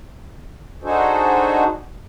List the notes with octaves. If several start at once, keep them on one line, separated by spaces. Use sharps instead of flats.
D4 D#4 F#4 G#4 A4 C5